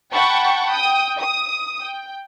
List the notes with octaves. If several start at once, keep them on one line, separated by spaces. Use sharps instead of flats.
F#5 G5 A5 B5 C#6
G5 D#6
D#6
G5